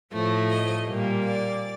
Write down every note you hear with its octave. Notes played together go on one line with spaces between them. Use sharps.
A2 F3 A3
D#5
A#2 G3 A#3
D5